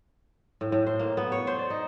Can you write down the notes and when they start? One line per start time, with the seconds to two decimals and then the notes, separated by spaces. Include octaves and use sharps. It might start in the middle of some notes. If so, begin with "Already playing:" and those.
0.61 A2
0.72 A2
0.87 C5
0.99 A#3
1.17 B3
1.32 C#5
1.47 C5
1.59 D5
1.70 D#4